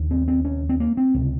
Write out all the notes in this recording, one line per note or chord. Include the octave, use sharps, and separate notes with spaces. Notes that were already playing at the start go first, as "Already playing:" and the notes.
Already playing: D#2 C#3
C4
C4
C#4
C4
A#3
C4
C#2 C3